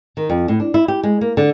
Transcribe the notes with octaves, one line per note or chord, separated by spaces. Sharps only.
D#3
F2
A2
D4
E4
G4
G#3
A#3
D3